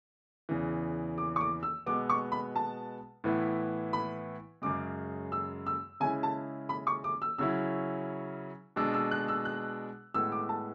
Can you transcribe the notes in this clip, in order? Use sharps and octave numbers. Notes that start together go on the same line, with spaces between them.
E2 C#3 E3
D6
C#6
D6
E6
B2 G#3 B3 D6
C#6
B5
A5
A2 E3 B3 E4
B5
F#2 C#3 G#3 D6
E6
E6
C#3 G#3 C#4 E4 G#5
A5
B5
C#6
D6
E6
C#3 F#3 C#4 E4 E6
B2 G#3 D4 E6
E6
F#6
E6
F#6
A2 G#3 B3 E6
D6
A5